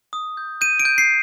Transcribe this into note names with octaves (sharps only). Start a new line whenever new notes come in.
D#6
G6
G6 D#7
D7
G6
C7